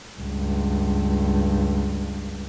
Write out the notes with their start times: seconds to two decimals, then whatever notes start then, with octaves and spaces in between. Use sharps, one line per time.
0.19 C#2 G2